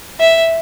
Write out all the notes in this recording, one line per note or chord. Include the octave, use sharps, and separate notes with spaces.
E5